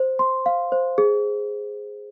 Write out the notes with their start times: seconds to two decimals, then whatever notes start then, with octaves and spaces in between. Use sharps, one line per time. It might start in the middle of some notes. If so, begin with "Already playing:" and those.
Already playing: C5
0.19 C6
0.46 F5
0.72 C5
0.98 G#4